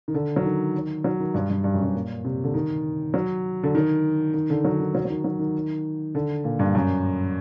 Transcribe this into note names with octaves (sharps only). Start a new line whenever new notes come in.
D#3
D3
F#3
D#3
F#3
D#3
G2
G2
G2
F#2
G2
A#2
C3
D3
D#3
F#3
D3
D#3
D#3
D3
F#3
D#3
F#3
F#3
D#3
F#3
D#3
D3
A#2
G2
F#2